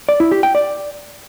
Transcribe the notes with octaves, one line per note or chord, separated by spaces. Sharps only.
D5
E4
G4
G5
D5